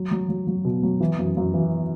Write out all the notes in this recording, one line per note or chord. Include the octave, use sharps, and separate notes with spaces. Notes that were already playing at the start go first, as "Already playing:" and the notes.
Already playing: F#3
F#3
F#3
F#3
B2
F#3
E3
F#2
F#2
E3